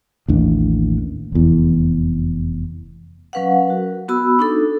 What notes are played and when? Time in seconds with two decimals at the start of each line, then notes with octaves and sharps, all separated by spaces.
0.28 A1 D#2 D4
1.32 F1 E2
3.33 F#3 C#4 B4 F5 F#5
3.68 F#4 A#4
4.08 B3 F#4 B5 E6
4.39 D4 D#4 A4